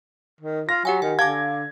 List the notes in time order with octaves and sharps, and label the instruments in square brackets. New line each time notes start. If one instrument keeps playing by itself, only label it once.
[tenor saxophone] D#3
[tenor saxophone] F4 [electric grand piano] A#6
[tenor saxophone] F#3 [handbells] G4 F#5 G#5
[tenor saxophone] D#3 [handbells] G#5
[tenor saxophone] D3 [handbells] F5 A5 D6 [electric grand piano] G#6